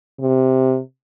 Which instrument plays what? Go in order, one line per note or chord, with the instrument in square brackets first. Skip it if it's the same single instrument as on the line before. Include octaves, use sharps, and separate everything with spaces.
[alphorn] C3